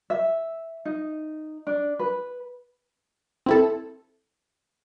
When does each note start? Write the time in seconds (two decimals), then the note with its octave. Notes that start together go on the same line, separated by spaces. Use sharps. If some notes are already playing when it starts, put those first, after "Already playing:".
0.10 E5
0.85 D#4
1.67 D4
1.99 B4
3.46 C4 E4 A4